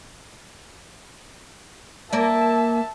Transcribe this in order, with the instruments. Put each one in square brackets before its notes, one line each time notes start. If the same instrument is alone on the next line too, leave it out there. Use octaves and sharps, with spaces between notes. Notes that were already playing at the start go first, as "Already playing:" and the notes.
[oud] A#3 D5 [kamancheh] E5 A5